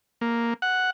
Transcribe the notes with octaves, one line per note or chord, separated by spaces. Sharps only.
A#3
F#5